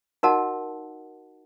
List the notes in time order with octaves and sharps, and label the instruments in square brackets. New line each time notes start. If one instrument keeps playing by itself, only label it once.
[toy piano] D#4 F#4 A#4 D#5 F#5 A5